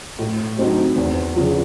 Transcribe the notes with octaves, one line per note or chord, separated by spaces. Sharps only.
A2
F#3 A3 C4 D#4
E2
C#3 F3